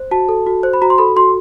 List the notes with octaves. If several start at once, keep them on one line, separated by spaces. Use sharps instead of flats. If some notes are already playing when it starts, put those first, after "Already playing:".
Already playing: C5
F#4 A5
A4
F#4
C5
B5
F#4 A#5
C6
A4 B5
F#4 C6